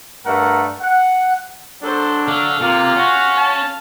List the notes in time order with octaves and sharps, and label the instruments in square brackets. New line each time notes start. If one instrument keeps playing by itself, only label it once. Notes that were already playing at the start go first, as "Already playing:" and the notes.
[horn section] G2 A3 A#4 F#5
F#5
[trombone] F#3 [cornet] D4 [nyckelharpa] A4 C5
[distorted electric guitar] D3 A4 [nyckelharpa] F5
[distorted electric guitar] C3 [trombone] A#3 [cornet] F4
[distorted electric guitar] C#4 [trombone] F#4
[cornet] A5